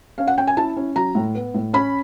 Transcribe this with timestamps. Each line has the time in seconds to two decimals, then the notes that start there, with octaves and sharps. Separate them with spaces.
0.18 C#4 F5
0.27 F#5
0.38 C#4 G5
0.47 G#5
0.57 E4 A5
0.77 C#4
0.96 F#3 A#5
1.15 A2
1.35 B3
1.54 A2
1.73 C#4 B5